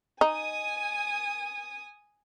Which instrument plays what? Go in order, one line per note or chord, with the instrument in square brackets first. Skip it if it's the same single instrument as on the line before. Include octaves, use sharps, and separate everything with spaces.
[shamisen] D#4 [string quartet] G#5 D#6